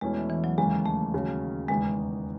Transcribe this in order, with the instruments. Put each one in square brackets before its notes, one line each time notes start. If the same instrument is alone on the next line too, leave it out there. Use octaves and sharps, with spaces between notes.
[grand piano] E2 B2 A3 C#4 E4 [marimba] G#3
[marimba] E3
E3
F#3
[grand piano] D#2 C#3 E3 [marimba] G#3
[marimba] A3
[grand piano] D#2 C#3 F#3 C#4
[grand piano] F#1 E2 D#3 [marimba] G#3